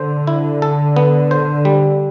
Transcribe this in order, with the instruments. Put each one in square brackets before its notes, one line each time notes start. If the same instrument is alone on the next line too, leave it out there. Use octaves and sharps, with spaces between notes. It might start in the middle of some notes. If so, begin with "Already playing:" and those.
Already playing: [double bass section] D3 [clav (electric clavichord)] C5
[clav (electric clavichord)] E4
A4
B3
C5
G3